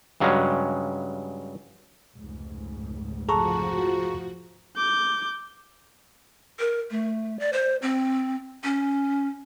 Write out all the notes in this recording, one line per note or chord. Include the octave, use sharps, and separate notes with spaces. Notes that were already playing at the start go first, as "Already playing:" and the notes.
G2 C#3 F#3 G#3 C#4
F1 C#2 G#2
F3 F#4 G#4 A4 F#5 A#5 C#6
D6 G6
A#4
A3
D5
C5
C4
C#4